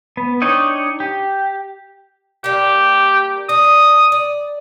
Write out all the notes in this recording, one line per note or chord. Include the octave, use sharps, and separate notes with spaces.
B3
D4 D#4 C#5 D#5 G5
G4
G3 A#3 G4
D4 D#6
D5